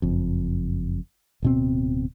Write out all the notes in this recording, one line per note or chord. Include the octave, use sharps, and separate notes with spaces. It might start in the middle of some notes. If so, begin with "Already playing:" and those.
F#1 F2
D1 B2 C4